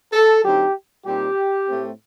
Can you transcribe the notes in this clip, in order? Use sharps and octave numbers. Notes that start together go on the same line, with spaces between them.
A4
D3 F#3 C4 D#4 G4
A#2 G3 C4 D#4 G4
A2 A3 C4